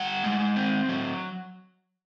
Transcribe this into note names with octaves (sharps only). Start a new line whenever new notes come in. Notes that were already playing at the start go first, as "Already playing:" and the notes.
Already playing: G3 F#5
G#3
C4
F#3